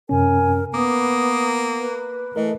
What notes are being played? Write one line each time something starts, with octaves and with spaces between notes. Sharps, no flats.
F#2 C3 C#4 A#4 G#5
A#3 B3 D6 D#6
B4
E3 A3 A#4 D#5